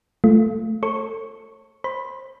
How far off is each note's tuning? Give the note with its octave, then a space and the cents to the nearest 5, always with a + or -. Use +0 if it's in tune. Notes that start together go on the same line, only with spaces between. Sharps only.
A3 +0 F4 -15
A4 +30 C#5 -40 C#6 +0
C5 +25 B5 +0